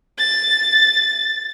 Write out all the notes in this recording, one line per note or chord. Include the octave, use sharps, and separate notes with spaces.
A6